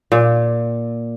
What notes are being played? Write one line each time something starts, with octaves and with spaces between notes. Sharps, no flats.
A#2